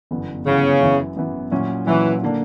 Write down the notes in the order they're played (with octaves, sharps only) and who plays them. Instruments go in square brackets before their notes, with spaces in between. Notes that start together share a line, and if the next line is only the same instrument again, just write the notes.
[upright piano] G1 F#2 E3 B3
[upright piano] G1 F#2 E3 B3 [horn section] C#3
[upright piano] F#2 E3 B3 E4
F#2 E3 B3 E4
A#2 F#3 C#4 E4
[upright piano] A#2 F#3 C#4 E4 [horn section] E3
[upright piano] D3 A#3 D4